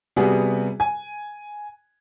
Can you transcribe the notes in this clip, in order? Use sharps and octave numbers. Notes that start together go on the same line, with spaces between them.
C3 G3 B3 F#4 G#4
G#5